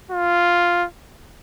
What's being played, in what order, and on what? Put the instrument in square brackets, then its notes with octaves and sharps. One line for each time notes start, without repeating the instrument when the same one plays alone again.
[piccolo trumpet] F4